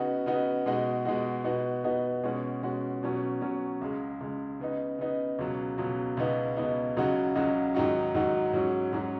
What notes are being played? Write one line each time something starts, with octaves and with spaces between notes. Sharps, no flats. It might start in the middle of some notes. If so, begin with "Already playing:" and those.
Already playing: C#3 B3 D#4 F#4
C#3 B3 D#4 F#4
B2 G#3 D#4 F#4
B2 G#3 D#4 F#4
B2 B3 D#4 F#4
B2 B3 D#4 F#4
B2 G#3 C#4 F#4
B2 G#3 C#4 F#4
B2 F#3 C#4 F#4
B2 F#3 C#4 F#4
C#2 C#3 G#3
C#2 C#3 G#3
C#3 B3 D#4
C#3 B3 D#4
C#2 B2 F#3
C#2 B2 F#3
C#2 B2 B3 D#4
C#2 B2 B3 D#4
C#2 C#3 F#3 D#4 F#4
C#2 C#3 F#3 D#4 F#4
G#2 D#3 F#3 D#4 F#4
G#2 D#3 F#3 D#4 F#4
G#2 F#3 C#4 F#4
G#2 F#3 C#4 F#4